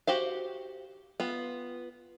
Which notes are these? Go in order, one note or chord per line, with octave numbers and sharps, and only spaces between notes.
F#4 G4 C5 F5
B3 F4